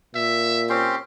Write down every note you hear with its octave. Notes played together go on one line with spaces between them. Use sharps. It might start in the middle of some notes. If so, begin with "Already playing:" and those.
A#2 E5
C4 C#4 G4 C6